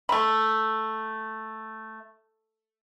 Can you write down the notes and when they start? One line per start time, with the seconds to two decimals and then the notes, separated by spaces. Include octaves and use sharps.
0.09 A3 B5